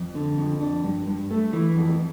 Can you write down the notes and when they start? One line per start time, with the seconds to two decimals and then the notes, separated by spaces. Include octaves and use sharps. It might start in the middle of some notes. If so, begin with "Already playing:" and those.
Already playing: F2
0.15 D3
0.38 F2
0.61 D4
0.84 G2
1.07 G2
1.31 A3
1.53 E3
1.76 F2